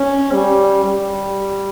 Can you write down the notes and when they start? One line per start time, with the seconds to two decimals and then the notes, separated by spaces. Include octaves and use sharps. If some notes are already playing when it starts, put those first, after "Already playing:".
Already playing: C#4
0.33 G3
0.84 G3